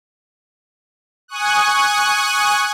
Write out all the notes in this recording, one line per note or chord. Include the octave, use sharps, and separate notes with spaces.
G#5 C#6 D#6 F#6